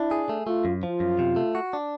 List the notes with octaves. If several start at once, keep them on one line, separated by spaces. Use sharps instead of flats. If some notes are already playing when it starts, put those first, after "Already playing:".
Already playing: D4 E4
G#4
A3
A3 F4
F#2
F3 F4
F#2
C3
A3
F#4
D4